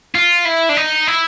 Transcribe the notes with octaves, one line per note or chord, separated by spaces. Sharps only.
F4
E4
D4
D#4
E4